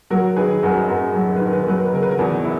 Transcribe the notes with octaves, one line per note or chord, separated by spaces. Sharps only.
F#3 F#4 A#4
D#3 G#4 B4
F#2 F#4 A#4
F#2 F#4 A#4
F#3
A#4
B4
D#3 A#4
B4
A#4
F#3 B4
A#4
B4
C#3 A#4
B4
F#4 A#4
E2
E4